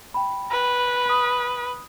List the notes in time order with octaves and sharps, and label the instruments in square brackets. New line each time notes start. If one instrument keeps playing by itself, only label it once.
[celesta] G5 B5
[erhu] B4
[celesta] B5 D#6